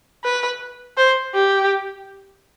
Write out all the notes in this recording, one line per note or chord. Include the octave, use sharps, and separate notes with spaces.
B4
C5
G4